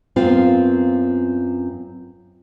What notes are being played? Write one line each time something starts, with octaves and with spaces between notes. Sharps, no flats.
F#2 B3 C4 F4 F5